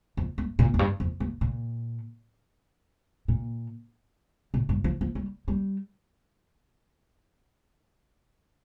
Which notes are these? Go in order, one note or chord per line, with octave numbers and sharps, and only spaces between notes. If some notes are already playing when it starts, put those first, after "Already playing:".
F2
G2
A#2
F2
G2
F2
G2
A#2
A#2
A#2
G2
F3
F3
G3
G3